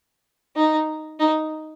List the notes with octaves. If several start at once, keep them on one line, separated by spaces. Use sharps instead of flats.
D#4
D#4